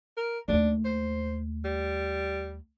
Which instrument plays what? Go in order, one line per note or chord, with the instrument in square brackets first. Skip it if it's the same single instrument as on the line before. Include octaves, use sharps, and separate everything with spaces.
[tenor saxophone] A#4
[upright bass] D#2 A3 [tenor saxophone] D4
[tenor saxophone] C5
G3